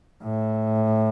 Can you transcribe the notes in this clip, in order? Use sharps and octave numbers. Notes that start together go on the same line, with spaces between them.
A2